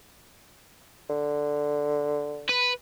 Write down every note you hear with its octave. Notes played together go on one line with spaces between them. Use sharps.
D3
B4